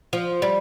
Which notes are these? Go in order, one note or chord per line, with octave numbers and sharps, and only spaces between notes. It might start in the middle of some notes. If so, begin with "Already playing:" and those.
F3
G3